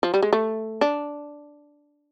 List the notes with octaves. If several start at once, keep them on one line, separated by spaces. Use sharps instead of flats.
F3
G3
G#3
A3
D4